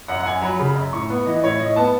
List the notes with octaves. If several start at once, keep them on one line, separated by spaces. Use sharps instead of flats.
F#2 F#5
F#5
F#2 G#5
F#3 B5
C#3 B5
F#2
A2 C#6
B3
E3 D#5
A2 C#5
A2 D#5
B3 A5